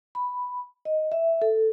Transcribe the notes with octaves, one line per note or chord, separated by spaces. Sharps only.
B5
D#5
E5
A4